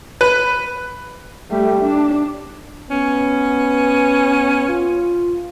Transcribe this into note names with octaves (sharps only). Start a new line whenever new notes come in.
B4
G3 A3
D4
B3 C#4
F4